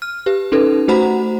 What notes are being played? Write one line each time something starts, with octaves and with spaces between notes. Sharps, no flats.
F6
G4 B4
C#4 D#4 A4 B4
A3 F#4 C5 F#5 A#5 B5